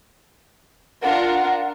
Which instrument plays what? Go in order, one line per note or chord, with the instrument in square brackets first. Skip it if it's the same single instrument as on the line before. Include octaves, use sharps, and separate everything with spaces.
[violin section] D4 F4 A#4 [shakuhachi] F#5